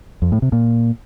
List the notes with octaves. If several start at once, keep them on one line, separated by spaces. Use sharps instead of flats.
F2
A2
C3
A#2